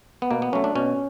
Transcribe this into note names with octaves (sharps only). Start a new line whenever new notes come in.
B3
B2 A#3
B3
F#3 A3 C#4
D4
B2 C#4